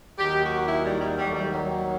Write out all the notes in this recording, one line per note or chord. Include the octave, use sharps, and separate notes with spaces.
D#2 D#3 F#3 G4
F#4
E4
G3
G3
D#2 D#3 F#3 G3
A3
G3
F#3